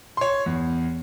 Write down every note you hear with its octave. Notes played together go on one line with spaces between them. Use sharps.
C#5 C6
E2